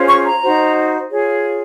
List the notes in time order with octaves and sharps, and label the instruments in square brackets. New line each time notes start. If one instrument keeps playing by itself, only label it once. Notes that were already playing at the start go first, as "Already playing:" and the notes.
Already playing: [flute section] C#4 F4 G#4 C5
C#6
A#5
D#4 F#4 C5
F4 G#4 C#5